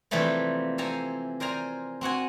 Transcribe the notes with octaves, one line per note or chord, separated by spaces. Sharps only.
C3 E3 F3 G3 A3 A#3
C4 A4 C5 G#5 A#5
A#4 C5 D5 G#5 A#5
C4 F#4 F#5 G#5